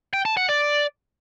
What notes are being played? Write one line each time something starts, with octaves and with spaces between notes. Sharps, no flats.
G5
A5
F#5
D5